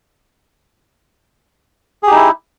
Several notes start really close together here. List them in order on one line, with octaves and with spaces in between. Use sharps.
G#4 G4 D#4 E4